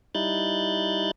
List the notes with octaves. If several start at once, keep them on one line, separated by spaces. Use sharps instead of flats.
G3 D#4 E4 F#6 G6 A6